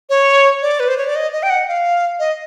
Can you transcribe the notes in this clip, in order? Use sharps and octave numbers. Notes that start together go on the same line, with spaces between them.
C#5
D5
B4
C5
C#5
D5
D#5
D#5
G5
F#5
F5
D#5